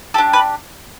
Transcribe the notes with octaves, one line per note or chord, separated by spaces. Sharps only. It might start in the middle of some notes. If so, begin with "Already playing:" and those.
D4 G4 A4
B4